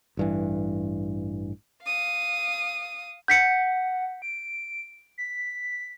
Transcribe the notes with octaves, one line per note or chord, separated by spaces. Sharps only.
A1 G2 E3
F5 D#6
F#5 G6 B6 C#7
D7
B6